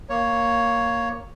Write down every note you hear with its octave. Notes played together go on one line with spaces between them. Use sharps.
A#3 C#5